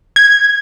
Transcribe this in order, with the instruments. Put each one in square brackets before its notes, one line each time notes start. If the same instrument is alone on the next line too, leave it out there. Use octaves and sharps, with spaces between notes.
[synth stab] G#6